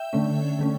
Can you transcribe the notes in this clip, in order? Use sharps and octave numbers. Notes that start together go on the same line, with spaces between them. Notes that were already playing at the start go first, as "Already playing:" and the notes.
Already playing: E5 G5
D3 A3 C#4
D3 A3 C#4